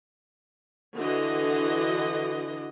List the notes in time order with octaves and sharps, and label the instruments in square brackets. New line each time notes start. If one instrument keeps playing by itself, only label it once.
[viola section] D3 E3 F#4 D#5